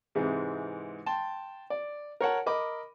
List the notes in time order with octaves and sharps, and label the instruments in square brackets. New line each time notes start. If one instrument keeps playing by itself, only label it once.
[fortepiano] G#2 C3 E3 G#3
G5 A5 C6
D5
A#4 C#5 F#5 A5
A#4 D#5 B5 D6